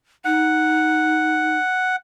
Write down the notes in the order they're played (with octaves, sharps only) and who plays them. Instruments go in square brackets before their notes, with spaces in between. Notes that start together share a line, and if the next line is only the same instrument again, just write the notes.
[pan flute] D#4 [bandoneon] F#5